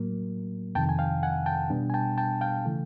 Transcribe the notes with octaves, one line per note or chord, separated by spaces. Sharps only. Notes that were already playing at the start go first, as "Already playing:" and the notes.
Already playing: A2 F#3 A#3
F2 C3 D#3 G5 A5
G#5
F5 G5
F#5 G#5
G5 A5
B2 G3 B3 D4
G#5
G5 A5
G5 A5
F5 G5
C#3 E3 A3